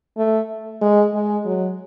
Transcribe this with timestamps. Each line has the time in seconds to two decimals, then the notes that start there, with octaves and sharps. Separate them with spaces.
0.18 A3
0.82 G#3
1.14 G#3
1.46 F#3